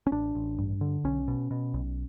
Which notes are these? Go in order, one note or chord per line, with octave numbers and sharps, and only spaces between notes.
C#4
A1 D4
A1
G2
D3
B1 C#4
B2
B2
B1